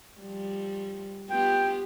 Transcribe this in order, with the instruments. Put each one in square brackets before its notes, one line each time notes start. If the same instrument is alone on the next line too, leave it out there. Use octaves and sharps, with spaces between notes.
[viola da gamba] F3 G3
[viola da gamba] B3 F4 G4 [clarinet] G5